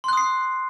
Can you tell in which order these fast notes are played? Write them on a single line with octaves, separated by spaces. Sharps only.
C6 F#6 D#6 C7